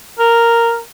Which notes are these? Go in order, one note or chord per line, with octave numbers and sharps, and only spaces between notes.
A#4